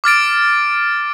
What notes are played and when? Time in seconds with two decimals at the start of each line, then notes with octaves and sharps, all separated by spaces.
0.04 D6 F6 A6 D7